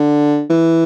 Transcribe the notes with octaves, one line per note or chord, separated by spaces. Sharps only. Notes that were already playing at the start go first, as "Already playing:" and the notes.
Already playing: D3
E3